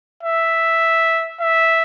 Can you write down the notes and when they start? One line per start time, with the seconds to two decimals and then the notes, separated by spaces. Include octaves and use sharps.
0.23 E5
1.40 E5